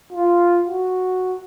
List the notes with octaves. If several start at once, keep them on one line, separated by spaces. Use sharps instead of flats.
F4
F#4